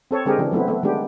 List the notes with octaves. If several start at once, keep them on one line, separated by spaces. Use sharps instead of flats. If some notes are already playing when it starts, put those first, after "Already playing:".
C4 A4 C#5
D3 G#3 C4 G4 G#4 A#4
C#3 E3 D4
F#3 A3 B3 C4 E4
A3 B3
D#3 G#3 A3 B3 D4 G4